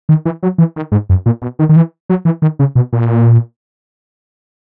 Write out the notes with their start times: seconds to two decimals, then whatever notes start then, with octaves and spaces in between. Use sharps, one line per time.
0.09 D#3
0.25 E3
0.43 F#3
0.58 E3
0.76 D#3
0.92 G#2
1.10 F#2
1.26 A#2
1.42 B2
1.59 D#3
1.69 D#3
1.76 E3
2.10 F#3
2.25 E3
2.42 D#3
2.59 C#3
2.75 B2
2.93 A#2